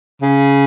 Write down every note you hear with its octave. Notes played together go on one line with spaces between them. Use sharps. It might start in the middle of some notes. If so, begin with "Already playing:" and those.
C#3